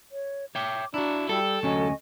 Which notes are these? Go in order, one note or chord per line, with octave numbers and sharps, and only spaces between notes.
C#5
C#5 E5 G5 D6
D4 E4 F#4 A#5
G3 A4 G5 E6
D2 F#3 C#4 D#5 G#5 C#6